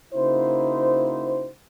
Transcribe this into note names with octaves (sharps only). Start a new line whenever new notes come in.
C#3 A#3 D#4 E4 F#4 C5